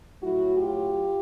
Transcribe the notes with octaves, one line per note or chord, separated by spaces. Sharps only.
A2 F#3 A3 E4 F#4
F4 G4